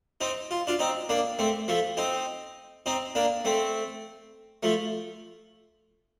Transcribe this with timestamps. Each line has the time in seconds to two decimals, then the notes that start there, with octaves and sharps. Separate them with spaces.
0.21 C4 D#4
0.51 F4
0.67 D4 F4
0.79 C4 D#4
1.09 A#3 D4
1.39 A3 C4
1.68 F3 A3
1.97 C4 D#4
2.86 C4 D#4
3.15 A#3 D4
3.45 A3 C4
4.63 F3 A3